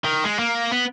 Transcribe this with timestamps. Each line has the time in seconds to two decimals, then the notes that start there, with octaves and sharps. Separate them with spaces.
0.04 D#3
0.24 G#3
0.39 A#3
0.72 B3